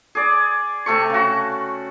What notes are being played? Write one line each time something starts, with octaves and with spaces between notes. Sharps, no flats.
G#4 D5
C3 A3 C#6
C#3 F#4